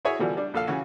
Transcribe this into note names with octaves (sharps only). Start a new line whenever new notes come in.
E4 F#4 G#4 C#5 E5 G#5
B2 D3 E3 F3 G3
G3 D4
A#1 A4 F5
C#3 E3 C#4 F#4